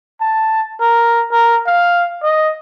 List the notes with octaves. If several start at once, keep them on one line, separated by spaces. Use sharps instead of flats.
A5
A#4
A#4
F5
D#5